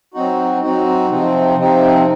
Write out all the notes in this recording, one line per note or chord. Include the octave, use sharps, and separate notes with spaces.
F#3 C4 D#4 F#4
F#3 C4 D#4 F#4
C3 F3 C4 D#4
C3 F3 C4 D#4